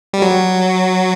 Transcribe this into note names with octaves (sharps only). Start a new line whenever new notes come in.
G3
F#3